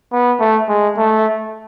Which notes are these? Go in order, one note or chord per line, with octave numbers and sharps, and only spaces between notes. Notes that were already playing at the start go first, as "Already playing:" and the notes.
B3
A3
G#3
A3